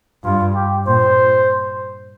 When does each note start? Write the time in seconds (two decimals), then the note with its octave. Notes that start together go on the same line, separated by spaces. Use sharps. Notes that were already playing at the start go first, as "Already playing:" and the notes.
0.24 G2 F4
0.55 G4
0.87 A#2 C5